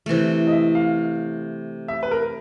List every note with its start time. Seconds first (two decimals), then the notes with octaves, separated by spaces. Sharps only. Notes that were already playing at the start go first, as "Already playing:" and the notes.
0.06 C3 E3 A3
0.47 D#5
0.52 E5
0.75 F5
1.88 E5
2.03 B4
2.11 A#4